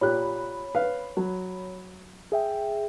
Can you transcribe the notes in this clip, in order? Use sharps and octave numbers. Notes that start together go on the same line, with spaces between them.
A#2 G4 C#5 B5 F#6
B4 F5
F#3
G#4 E5 G5